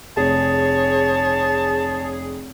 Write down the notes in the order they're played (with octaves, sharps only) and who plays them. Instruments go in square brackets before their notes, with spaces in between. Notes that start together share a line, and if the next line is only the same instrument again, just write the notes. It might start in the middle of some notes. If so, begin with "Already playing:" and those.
[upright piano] F1 [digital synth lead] G#4 [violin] C#5 [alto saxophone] A5